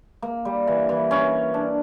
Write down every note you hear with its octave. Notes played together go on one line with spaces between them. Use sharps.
A#3
G3
E3
E3
C#4
D4